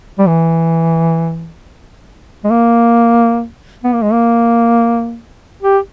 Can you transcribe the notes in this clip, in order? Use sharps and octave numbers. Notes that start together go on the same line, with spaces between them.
G3
E3
G#3
A#3
B3
A#3
G#3
A#3
G4